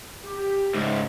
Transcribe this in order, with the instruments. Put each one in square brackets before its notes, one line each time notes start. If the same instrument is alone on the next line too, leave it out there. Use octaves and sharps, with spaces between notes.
[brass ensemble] G4
[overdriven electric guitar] C#2 G#2